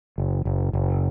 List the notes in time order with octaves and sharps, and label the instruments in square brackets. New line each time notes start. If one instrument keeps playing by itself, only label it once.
[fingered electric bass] F#1
F#1
F#1